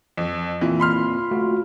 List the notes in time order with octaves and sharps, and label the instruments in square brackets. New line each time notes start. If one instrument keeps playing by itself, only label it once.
[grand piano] F2
[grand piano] E3 [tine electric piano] A#3 C4 F4
[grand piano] B5 C6 F6
[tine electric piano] A3 F4 F#4